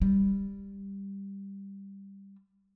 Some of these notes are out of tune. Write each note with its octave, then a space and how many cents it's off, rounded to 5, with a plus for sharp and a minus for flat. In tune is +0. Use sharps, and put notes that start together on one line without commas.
G3 +10